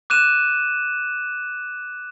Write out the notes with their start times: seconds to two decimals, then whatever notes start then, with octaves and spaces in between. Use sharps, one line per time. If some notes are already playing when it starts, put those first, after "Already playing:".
0.10 D6 F#6 D#7 E7